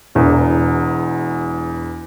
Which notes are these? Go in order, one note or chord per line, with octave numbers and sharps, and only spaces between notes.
E1 E2